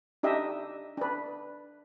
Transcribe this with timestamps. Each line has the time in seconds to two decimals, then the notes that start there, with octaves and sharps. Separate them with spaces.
0.23 D4 D#4 G4 D#5 E5
0.97 D4 B4